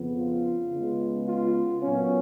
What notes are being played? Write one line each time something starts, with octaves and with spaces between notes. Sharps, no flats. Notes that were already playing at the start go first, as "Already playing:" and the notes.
Already playing: F2 C#3 F3 B3
F4
C#3 G#3 B3
F4
A#2 F#3 B3 C#4